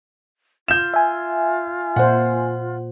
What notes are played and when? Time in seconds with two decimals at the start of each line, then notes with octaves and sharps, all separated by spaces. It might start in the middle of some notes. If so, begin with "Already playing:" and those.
0.68 F4 G6 E7
0.94 E5 G#5
1.96 A#2 C5 F#5